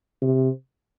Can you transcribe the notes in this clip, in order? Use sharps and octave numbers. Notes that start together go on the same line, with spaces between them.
C3